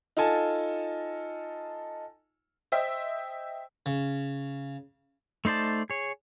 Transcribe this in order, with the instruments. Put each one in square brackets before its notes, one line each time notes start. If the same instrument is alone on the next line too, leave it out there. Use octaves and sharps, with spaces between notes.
[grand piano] D#4 F4 A4 G#5 A5
[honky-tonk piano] C5 D#5 E5 G5
[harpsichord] C#3
[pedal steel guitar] A3 D#4 C5 D5 A5
G#4 C#5